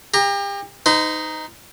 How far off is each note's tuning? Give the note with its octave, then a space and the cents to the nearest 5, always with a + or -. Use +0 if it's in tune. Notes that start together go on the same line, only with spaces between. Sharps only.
G4 +35 A#5 +0
D#4 +0 C5 -45